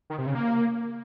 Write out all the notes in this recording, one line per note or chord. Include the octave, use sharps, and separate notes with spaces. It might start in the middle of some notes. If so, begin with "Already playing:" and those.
D#3
C3
C#3
A#3